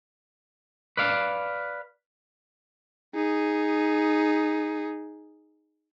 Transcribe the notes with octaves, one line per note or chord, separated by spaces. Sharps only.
B4 D5 F5
D#4 G#4